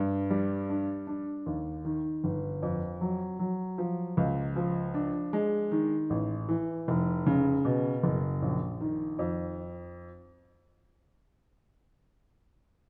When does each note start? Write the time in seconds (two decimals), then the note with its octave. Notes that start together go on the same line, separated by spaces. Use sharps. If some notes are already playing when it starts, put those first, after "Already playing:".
Already playing: G2
0.30 G3
0.70 D4
1.07 D4
1.46 D#2
1.85 D#3
2.24 G1
2.62 F2
3.01 F#3
3.39 F#3
3.78 F3
4.17 C#2
4.56 F3
4.94 D4
5.33 G#3
5.71 D#3
6.10 A1
6.49 E3
6.88 F1
7.26 C#3
7.65 B2
8.03 F#1
8.42 A#1
8.81 D#3
9.19 F2